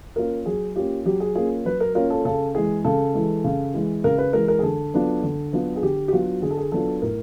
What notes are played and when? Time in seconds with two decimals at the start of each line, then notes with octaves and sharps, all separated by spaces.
0.16 A#3 C#4 F4 A#4
0.46 F#3 G#4
0.76 A#3 C#4 F4 G4
1.05 F#3 G4
1.20 G#4
1.35 A#3 C#4 F4 G#4
1.66 F#3 B4
1.80 A#4
1.95 A#3 C#4 F4 A#4
2.10 A4
2.25 C#3 A4
2.55 E3 G#3 G#4
2.85 C#3 A4
3.14 E3 G#3
3.44 C#3
3.74 E3 G#3
4.04 C#3 A#4
4.18 B4
4.33 E3 G#3 A#4
4.48 A#4
4.59 G#4
4.63 D3 A4
4.93 F#3 B3 D4 F4
5.23 D3
5.53 F#3 B3 D4 F4
5.76 G#4
5.83 D3 G4
6.08 G4
6.13 F#3 B3 D4 F4 F#4
6.42 D3 G#4
6.51 A4
6.57 G#4
6.72 F#3 B3 D4 F4 A4
7.02 A2 A#4